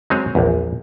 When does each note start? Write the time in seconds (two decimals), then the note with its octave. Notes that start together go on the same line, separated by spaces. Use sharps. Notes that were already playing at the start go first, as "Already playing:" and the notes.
0.10 F#3 G#3 C4 G#4 C#5
0.35 A#1 E2